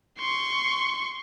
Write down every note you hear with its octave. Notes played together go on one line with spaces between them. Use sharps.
C6 C#6